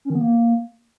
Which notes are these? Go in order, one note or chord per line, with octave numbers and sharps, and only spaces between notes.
C#4
D#3
B3
A#3